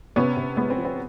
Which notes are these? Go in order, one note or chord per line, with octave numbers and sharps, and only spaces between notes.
C3 B3 C#4
C3
G#3 B3
C4
F3
C4